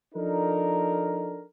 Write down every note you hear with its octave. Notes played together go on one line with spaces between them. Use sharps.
F3 D4 D#4 A4 A#4